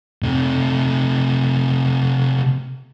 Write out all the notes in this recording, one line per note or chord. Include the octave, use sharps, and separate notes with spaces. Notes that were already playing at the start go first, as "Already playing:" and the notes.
C3 A3